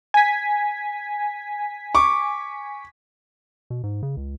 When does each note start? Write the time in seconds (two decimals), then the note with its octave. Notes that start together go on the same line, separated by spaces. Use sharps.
0.14 G#5 B6
1.95 C#6 D6
3.70 B2
3.84 G#2
4.03 C#3
4.17 C#2